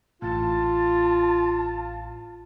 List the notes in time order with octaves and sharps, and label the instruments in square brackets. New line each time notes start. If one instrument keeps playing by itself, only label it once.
[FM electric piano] A1 A2 [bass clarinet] F4 [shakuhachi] A5